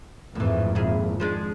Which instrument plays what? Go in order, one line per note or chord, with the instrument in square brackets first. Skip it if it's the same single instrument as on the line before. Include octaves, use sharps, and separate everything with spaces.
[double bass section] G#1 F2 [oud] A2 E3
[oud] A#2 E4 G#4
F3 G#3 D4